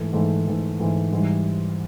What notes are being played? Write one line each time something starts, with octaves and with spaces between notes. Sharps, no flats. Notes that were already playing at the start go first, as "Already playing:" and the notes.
Already playing: G#2 E3 A3
G#2 E3 A3
G#2 E3 A3
G#2 E3 A3
G#2 E3 G3